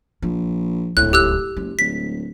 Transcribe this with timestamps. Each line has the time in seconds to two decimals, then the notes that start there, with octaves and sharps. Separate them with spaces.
0.22 A#1 F3
0.97 D1 C#2 A2 F#6
1.13 G4 E6 F#6
1.56 F#1 G#3
1.79 D1 B6